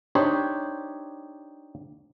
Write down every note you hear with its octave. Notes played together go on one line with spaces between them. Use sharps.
D4 D#4 G4 C5 C#5